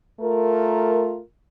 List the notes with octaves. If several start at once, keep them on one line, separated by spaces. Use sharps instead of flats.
A3 F4 A#4